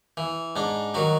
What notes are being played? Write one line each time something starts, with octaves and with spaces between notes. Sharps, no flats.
E3
G#2 D4
D#3 F#3 F#4